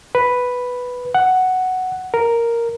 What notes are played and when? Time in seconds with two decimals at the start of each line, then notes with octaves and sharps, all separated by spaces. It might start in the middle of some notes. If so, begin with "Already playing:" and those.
0.15 B4
1.14 F#5
2.14 A#4